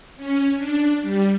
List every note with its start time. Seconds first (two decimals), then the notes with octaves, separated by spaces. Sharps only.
0.17 C#4
0.57 D4
1.02 G3